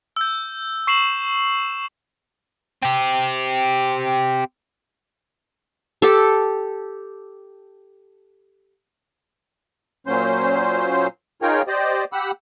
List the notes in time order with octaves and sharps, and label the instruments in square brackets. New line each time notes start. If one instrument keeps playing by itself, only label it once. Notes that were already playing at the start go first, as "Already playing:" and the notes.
[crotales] E6 G6
C#6 C7 E7 F#7
[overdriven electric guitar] C4 G4
[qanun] G4 A4
[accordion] A#2 F#3 C#4 C5 C6
D#4 F4 G#4 A#4 C#5 G5
G4 C5 D5 D#5
G4 F#5 B5 E6